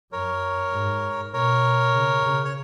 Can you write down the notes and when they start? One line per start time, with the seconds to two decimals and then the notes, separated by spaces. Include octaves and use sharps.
0.12 F#2 A#4 C#5
0.72 G#2
1.33 B2 A#4 C#5
1.93 C#3
2.23 C#3
2.45 C#5